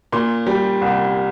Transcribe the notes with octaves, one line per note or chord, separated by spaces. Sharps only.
A#2 C6
G3
C2